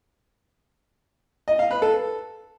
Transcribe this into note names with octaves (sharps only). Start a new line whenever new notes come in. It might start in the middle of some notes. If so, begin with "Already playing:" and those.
D#5
F5
B4
A4